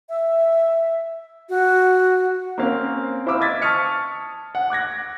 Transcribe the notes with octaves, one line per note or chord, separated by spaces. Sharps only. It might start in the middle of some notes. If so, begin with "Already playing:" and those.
E5
F#4
A#3 C4 C#4 F5
E4 C5 F5 B5 D6 E6
D#5 E6 G#6 A6 B6
A5 C#6 D#6 F6 C#7
F#5
D6 F#6 G#6 A#6